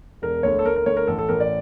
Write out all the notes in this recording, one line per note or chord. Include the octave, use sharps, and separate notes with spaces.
E1 A#4
D2 C#5
A4
D2 A#4
A#4
D2 C#5
A#4
A1 A4
A4
A1 A#4
D5